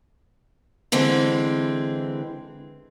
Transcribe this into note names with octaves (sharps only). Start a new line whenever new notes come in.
D3 E3 G#3 C4